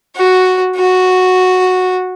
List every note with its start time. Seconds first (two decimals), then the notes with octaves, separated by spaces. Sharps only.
0.16 F#4
0.76 F#4